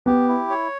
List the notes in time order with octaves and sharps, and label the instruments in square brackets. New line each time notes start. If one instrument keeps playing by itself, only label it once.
[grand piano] B3 [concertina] G4
[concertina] E4
C#5